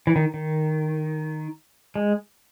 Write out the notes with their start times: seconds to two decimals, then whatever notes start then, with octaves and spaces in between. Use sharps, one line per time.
0.07 E3
0.16 D#3
0.34 D#3
1.96 G#3